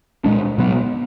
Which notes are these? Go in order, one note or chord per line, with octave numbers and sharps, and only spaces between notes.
A#2 G#3 D4
B2 F#3 B3